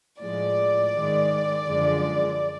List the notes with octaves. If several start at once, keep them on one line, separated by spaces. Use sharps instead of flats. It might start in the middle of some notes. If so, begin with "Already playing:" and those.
A2 F3 G#3 D5
G#2 D#3 G#3
F#2 D3 F3 G#3